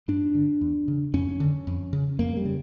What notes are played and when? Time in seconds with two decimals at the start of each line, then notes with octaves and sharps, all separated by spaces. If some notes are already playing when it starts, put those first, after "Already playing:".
0.08 G2 D4
0.35 D3
0.61 E2
0.88 C#3
1.14 F2 C#4
1.40 D3
1.67 F2
1.93 C#3
2.19 F2 A#3
2.37 G3
2.45 C#3